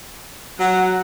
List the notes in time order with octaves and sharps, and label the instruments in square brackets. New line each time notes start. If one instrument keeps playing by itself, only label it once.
[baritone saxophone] F#3 [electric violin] F#5